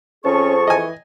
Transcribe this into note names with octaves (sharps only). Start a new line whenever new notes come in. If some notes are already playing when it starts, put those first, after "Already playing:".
F2 C#4 G#4 C5 A5 C#6
E3 D#5 G#5